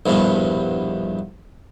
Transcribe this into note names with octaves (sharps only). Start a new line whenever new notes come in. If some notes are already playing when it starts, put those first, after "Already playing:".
A#1 E2 G2 B2